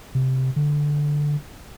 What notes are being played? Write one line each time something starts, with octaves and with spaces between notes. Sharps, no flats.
C3
D3